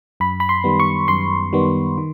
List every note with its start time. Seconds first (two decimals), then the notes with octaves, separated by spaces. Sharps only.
0.20 F#2 B5
0.40 B5
0.49 C6
0.64 D#3 G3 B3
0.80 C#6
1.08 F#2 C6
1.53 D#3 G3 B3
1.98 D#3